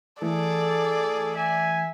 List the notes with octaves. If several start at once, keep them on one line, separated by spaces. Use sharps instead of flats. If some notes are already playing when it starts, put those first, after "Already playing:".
E3 A3 G#4 A4 D5
E5 G#5